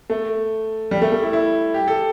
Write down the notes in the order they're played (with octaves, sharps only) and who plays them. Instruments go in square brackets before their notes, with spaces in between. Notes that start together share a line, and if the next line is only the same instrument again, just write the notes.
[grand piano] A3
G3
A3
A3
E4
E4
G4
A4